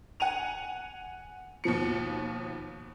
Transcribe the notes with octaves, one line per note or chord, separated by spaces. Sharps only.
F#5 G#5 D#7 F7
D#2 B2 F3 C#7